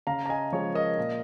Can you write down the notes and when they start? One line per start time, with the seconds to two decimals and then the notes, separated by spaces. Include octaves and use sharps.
0.07 C#3 F5 A#5
0.26 A#5
0.29 D#5 G#5
0.52 F3 G#3 C#5
0.75 A#4 D#5
0.98 A#2